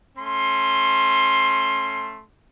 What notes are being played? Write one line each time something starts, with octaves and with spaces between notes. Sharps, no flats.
A3 C#4 C6